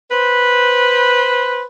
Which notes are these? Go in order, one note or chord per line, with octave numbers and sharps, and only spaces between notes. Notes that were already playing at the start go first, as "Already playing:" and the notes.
B4 C5